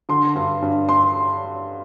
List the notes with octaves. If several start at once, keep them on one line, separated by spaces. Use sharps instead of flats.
D3 C6
G2
G2
C6